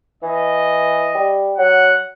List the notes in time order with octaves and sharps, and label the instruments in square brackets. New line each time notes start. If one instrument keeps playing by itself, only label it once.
[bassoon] E3 [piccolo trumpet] D#5
[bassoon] G3
[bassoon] F#3 [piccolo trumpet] F#5